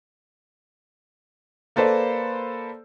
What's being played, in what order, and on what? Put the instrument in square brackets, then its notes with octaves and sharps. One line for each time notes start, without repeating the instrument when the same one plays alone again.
[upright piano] A#3 A4 B4 C5 D5